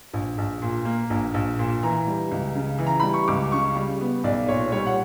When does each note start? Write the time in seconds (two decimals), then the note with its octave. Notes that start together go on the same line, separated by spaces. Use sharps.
0.13 A#1
0.38 A#1
0.62 A#2
0.85 A#3
1.10 A#1
1.34 A#1
1.59 A#2
1.83 E3 A#5
2.07 G3
2.31 C#2
2.55 C#3
2.79 E3
2.87 A#5
3.00 G3 B5
3.14 C#6
3.28 C#2 D6
3.52 C#3 C#6
3.75 G3
4.01 B3
4.24 B1 D5
4.48 A#2 C#5
4.72 G3 C#5
4.86 F#5